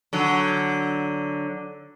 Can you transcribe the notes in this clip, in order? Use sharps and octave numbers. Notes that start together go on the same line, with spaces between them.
D3 F#3